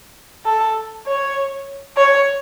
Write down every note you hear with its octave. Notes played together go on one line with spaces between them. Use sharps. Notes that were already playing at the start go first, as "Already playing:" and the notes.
A4
C#5
C#5